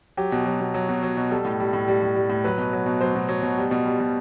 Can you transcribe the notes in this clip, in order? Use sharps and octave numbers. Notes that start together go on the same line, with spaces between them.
F#3 G4
B2
F#3
B2
F#3
B2
F#3
B2
G3 A4
A2
G3
A2
G3
A2
G3
A2
F#3 B4
B2
F#3
B2
F#3 C5
B2
F#3
B2
G3
B2
G3
B2